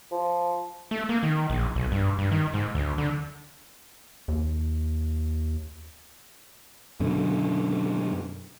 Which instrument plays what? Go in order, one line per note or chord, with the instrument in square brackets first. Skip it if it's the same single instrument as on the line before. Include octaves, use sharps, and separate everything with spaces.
[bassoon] F3
[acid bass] A3
A#3
D#3
A#1
B1
G2
G2
D#3
G#2
D2
D3
[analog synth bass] D#2
[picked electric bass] F#2 B2 D3